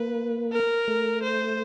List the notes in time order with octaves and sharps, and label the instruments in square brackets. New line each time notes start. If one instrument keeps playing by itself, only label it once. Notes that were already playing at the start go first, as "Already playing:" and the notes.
Already playing: [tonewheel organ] A#3 [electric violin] B4
[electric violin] A#4
[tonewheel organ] A3
[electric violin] C5